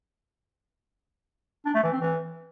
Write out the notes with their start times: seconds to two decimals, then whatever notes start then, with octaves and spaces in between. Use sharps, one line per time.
1.65 D4
1.74 A3
1.83 E3
1.92 C4
2.01 E3